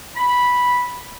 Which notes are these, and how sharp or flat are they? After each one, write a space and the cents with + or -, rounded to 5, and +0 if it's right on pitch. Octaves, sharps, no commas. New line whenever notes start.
B5 -5